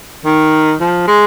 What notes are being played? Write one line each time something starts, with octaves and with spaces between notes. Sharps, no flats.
D#3
F3
G#3